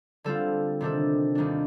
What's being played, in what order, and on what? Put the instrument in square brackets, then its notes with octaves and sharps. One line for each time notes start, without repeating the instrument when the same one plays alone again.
[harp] D3 G3 C4 F4 A4
C3 D#3 G3 D4 A4
D#2 D#3 G3 D4